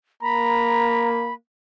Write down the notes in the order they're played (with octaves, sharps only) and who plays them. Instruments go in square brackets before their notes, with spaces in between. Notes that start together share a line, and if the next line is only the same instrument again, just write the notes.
[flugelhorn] A#3 [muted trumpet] A#5 [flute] B5